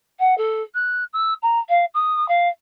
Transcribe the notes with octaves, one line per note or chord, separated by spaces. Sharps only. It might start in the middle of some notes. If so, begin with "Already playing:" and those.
F#5
A4
F#6
E6
A#5
F5
D#6
F5